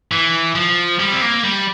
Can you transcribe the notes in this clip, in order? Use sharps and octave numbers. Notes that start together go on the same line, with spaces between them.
E3
F3
G3
C4
A#3
G3